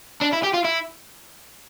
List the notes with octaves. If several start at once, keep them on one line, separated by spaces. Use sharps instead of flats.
D4
E4
G4
F4
E4